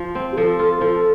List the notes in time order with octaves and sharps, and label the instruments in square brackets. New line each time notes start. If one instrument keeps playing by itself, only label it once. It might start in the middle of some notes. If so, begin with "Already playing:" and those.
Already playing: [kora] F3
C4
[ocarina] G4
[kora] F3 [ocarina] A4
[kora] F4
[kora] F3 [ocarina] A4